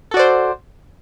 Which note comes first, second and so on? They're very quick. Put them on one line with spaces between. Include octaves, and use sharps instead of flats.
A4 F#4 D5 C5